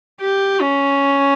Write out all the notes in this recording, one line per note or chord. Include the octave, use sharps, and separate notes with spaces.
G4
C#4